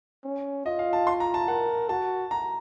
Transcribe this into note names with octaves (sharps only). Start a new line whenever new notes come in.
C#4
F4 D#5
F5
A5
C6
A#5
A5
A#4 F#5
F#4 A5
A#5